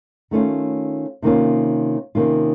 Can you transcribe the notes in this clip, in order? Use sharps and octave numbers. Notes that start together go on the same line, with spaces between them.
D#3 A3 C#4 F4
C3 D#3 A#3 C#4 F4
C3 D#3 A#3 C#4 F4